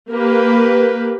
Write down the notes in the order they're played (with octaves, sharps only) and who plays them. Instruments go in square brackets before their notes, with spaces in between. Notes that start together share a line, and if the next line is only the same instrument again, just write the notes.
[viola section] A#3 G4 B4